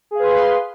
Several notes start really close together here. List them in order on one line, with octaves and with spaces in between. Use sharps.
G#4 F5 B4 C6